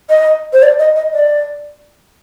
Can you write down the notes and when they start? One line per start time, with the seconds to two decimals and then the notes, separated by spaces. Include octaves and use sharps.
0.10 D#5
0.53 C5
0.62 D5
0.79 D#5
0.96 D#5
1.13 D5